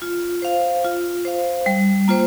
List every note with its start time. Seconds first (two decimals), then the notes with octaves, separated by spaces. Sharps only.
0.02 F4
0.42 C5 F5
0.85 F4
1.25 C5 F5
1.66 G3
2.08 A#3 F4 C5